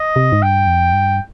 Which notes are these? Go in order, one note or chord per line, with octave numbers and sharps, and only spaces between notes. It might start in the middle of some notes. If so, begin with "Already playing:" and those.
Already playing: D#5
C3
G#2
G2 G5
F2
G2